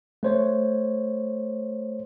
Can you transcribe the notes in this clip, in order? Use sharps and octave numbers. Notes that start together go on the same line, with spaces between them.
A3 C5 C#5